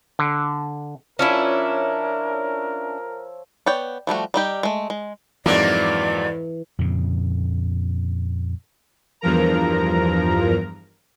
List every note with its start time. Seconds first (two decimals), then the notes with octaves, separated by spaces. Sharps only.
0.19 D3
1.19 F3 C#4 D4 E4 A#4 C#5 E5
3.66 B3 C#5 D5 G5
4.07 F3 G3 A3 F#4
4.34 G3 D#4 G4
4.63 G#3 A3
4.90 G#3
5.46 F2 G#2 E3 F#3 A#3 D5
6.79 F2 A#2 C#3
9.21 E2 G2 F3 A#4 A#5